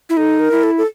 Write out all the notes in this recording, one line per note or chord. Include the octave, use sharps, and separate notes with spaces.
E4
D#4 A4
A#4
E4
A4
A4